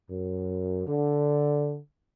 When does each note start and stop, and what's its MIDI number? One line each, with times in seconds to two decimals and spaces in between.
0.10 0.86 42
0.87 1.79 50